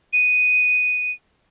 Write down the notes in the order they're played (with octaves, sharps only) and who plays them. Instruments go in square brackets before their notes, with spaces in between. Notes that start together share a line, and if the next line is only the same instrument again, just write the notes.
[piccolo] D#7